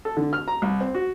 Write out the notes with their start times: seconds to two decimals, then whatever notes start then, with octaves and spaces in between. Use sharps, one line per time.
0.05 A4
0.17 D3
0.33 F6
0.48 A#5
0.62 C2
0.81 C4
0.95 F#4